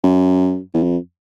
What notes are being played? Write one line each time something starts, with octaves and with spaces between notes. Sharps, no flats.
F#2
E2
F2